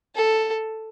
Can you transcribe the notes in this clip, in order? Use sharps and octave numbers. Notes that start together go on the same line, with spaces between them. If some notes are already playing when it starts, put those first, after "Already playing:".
A4